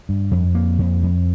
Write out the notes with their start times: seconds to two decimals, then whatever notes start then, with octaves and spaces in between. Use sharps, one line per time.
0.09 G2
0.31 F2
0.55 A#3
0.79 F2
1.03 F2